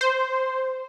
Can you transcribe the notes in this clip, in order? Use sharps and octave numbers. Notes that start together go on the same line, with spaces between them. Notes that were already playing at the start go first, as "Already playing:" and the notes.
C5